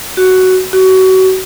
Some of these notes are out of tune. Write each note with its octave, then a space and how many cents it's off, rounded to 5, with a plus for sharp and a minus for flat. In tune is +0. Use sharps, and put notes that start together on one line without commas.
F#4 +10
F#4 +30